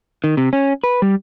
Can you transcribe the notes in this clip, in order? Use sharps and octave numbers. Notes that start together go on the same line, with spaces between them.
D#3
C3
C#4
B4
G3